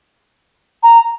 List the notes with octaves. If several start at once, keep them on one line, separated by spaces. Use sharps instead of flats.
A#5